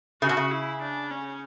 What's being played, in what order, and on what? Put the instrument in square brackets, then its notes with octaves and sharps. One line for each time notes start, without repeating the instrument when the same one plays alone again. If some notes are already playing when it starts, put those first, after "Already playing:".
[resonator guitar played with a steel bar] C#3 [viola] F#4
[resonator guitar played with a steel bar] B2
C#3
[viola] E4
D4
C#4